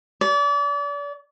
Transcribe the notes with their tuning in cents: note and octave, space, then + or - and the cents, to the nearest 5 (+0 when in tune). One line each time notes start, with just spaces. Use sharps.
D5 -35